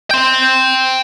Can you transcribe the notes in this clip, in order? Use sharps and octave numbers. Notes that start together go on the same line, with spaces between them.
G5 C6